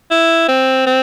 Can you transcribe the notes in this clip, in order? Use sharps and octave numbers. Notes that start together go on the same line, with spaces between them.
E4
C4
C4